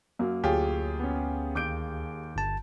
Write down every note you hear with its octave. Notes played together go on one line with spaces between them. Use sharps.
F#2 F#3 A#3
D2 F4 G4 G#4 C#5
B3 C#4
D#2 D6 G6 D7
G1 A5